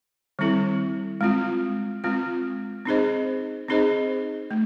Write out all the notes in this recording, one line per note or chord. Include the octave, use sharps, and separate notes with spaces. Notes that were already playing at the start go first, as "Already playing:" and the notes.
D#3 G3 C4 E4 A4
G#3 C4 F4
G#3 C4 F4
C4 D#4 G#4 C5 D#5
C4 D#4 G#4 C5 D#5
A3